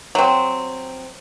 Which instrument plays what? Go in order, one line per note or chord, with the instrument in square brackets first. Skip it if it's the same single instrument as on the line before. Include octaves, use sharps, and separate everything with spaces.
[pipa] F#3 C4